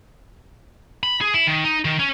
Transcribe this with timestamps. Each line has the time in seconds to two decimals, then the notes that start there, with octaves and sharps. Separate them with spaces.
1.03 B5
1.21 G#4
1.34 E4
1.47 D#3
1.64 D#4
1.85 D#3
2.00 C#4